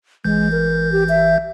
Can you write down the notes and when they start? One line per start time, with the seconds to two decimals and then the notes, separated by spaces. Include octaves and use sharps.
0.24 A1 E3 G#3 G6
0.52 A#4
0.92 G4
1.09 E5